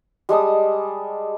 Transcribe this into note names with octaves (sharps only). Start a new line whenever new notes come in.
G3 G#3 A5 D#6